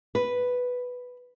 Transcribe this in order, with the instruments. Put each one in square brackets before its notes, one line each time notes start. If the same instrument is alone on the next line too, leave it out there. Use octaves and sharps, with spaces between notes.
[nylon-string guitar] B4